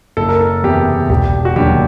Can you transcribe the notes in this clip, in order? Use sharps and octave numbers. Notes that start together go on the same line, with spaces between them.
F#1 A4
A#4
A4
E2 C3 G4
E1 G4
F#4
D#2 D3 F#3 G4